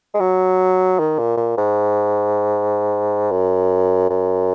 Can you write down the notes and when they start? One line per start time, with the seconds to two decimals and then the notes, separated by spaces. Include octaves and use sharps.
0.14 G#3
0.20 F#3
0.99 D#3
1.18 A#2
1.37 A#2
1.57 G#2
3.31 F#2
4.10 F#2